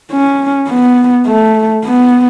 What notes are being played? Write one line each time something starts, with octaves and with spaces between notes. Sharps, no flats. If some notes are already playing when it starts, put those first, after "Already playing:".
C#4
B3
A3
B3